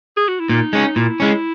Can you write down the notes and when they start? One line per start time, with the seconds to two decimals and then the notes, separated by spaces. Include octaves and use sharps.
0.17 G#4
0.28 F#4
0.39 E4
0.49 A#2 D#4
0.73 G#3 C#4
0.96 A#2 E4
1.20 G#3 C#4